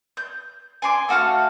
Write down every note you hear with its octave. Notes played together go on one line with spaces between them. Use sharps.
G6
G#5 C6 D6
A3 F#4 F5 C#6